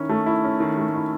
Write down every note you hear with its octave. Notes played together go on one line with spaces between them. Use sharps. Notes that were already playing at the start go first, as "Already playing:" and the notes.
Already playing: D#3 C#4 E4
A3
E4
C#4
D#3
A3
E4